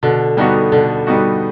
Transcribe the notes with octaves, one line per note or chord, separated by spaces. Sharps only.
B2 D3
D3 G3 B3 D#4 F#4
B2 D3
G3 B3 D#4 F#4